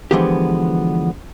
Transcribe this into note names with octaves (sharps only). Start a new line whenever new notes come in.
D3 E3 F3 G#3 B3 G4